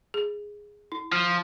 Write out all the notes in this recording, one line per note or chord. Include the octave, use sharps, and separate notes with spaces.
G#4
E4
F3 F6